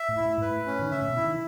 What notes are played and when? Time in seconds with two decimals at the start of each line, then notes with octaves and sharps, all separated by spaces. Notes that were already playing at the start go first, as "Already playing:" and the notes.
Already playing: E5
0.08 A2
0.17 E4
0.26 A2
0.37 G#2 B4
0.49 A2
0.66 C#4
0.81 D#3
0.91 C#3 E5
1.01 A2
1.08 B2
1.16 E4
1.25 D#3